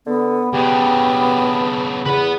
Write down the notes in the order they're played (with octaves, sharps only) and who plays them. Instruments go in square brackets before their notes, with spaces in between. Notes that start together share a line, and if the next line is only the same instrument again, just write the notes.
[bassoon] D3 [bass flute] B3
[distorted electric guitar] C#3 D4 [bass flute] B3 [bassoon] G4
[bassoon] E2 [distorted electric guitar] B4 F#5